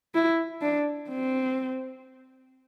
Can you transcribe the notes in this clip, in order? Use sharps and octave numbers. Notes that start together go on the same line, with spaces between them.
E4
D4
C4